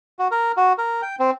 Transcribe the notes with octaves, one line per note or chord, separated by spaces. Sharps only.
F#4
A#4
F#4
A#4
G5
C4